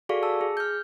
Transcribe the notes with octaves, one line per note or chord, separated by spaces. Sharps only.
F#4 G#4 A4 D5 F5 C#6
A5 E6
G#4
F6 G6